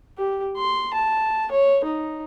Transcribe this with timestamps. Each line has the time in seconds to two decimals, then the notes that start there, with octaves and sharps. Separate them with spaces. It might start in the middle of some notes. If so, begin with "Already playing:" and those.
0.18 G4
0.57 C6
0.93 A5
1.51 C#5
1.84 D#4